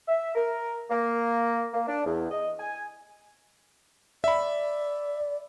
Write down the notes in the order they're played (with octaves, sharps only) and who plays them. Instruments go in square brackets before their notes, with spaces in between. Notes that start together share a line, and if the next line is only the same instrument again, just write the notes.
[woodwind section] E5
A#4
A#3
A#3
D4
E2
D#5
G#5
[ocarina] D5 [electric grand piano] E5 B5